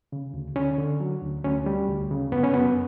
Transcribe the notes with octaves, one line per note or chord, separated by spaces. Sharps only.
C#3
D2
D3 C#4
D3
F#3
D2
D2 C#4
G3
D2
C#3
F#2 B3
C#4
F#2 B3